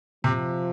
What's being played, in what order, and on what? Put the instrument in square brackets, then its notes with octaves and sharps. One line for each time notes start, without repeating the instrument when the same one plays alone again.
[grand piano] C3 [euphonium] F3